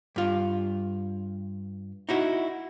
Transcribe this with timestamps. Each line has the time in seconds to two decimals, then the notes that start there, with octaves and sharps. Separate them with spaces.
0.16 G2 F4
2.09 D#4 E4 F#4